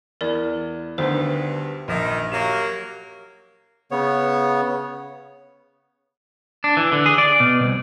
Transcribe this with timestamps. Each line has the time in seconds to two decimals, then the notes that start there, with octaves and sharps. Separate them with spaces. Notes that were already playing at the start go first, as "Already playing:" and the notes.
0.21 E2 A#4 D5
0.98 D2 G2 D#3 B3 C5
1.88 A#1 D#3
2.32 F#3 A#3 G4
3.91 C#3 B3 C#5
6.64 D4
6.77 E3
6.92 D3
7.06 G#4
7.18 D5
7.40 B2
7.62 C2